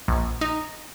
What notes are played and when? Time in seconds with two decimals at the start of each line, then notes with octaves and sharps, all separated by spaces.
0.08 A#1
0.41 D#4